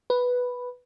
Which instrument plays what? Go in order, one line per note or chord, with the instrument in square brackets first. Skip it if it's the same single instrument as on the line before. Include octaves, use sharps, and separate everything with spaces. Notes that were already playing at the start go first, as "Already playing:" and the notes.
[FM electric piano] B4